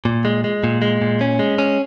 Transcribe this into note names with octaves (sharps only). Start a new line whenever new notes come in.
A#2
G#3
G#3
A#2
G#3
A#2
C#4
G#3
C#4